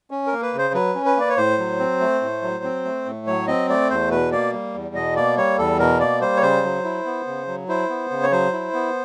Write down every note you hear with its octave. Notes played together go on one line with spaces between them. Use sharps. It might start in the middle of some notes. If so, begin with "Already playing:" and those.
C#4
A#4
A#3
B4
C#3 C5
F#3 B4
C#4
B4
A#3 D5
C#5
A2 C5
F#3
C4
A3
A2
F#3
C4
A3
A2
F#3 C#5
C4 D#5
A3 D5
E2 C5
B2 B4
A#3 D5
G3
E2
B2 D#5
A#3 D5
G3 C#5
E2 A4
B2 A#4
A#3 D5
G3 C5
C#5
C#3 C5
F#3
E4
B3
C#3
F#3
E4 C5
B3
C#3
C#5
F#3 C5
E4
B3